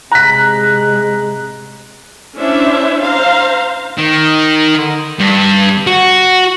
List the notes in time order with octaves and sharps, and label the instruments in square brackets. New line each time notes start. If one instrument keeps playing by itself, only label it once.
[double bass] C3 G#3 [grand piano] A#5 B6 [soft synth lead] F#6
[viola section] C#4 D4 E4 C5 E5
C5 F5 A#5
[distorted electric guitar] D#3
G2
F#4